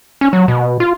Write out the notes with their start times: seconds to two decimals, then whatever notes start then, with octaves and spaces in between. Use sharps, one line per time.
0.21 C#4
0.33 F#3
0.48 B2
0.80 F4